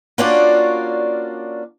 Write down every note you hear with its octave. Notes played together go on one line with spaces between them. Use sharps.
A#3 C#4 D4 F4 F#4 D5